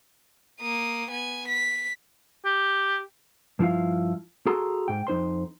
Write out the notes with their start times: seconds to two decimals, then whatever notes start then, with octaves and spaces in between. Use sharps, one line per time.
0.60 A#3 D#6
1.11 B3 G#5
1.48 B6
2.45 G4
3.59 G2 F3 E4 F4 F5
4.46 F#4 G#4 A4 A#5 C6
4.88 G#2 G5
5.07 F2 D#4 C5 C6